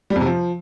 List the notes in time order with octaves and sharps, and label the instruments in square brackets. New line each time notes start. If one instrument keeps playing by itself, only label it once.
[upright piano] G3
F2
C3
F3